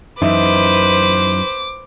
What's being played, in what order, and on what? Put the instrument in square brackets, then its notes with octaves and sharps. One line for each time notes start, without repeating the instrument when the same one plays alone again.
[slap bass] F#2 E3 [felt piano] D#4 E5 [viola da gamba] B4 C5 [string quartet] D6